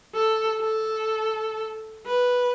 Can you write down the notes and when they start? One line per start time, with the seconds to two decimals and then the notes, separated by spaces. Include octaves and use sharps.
0.14 A4
0.62 A4
2.06 B4